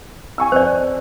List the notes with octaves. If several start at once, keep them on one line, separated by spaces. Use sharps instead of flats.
G#5 C#6 E6
F2 C5 D5